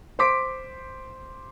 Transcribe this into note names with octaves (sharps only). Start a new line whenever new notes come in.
C5 C6 D6 B6 D7